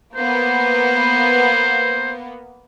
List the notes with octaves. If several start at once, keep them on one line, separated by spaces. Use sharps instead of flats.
A#3 B3 C5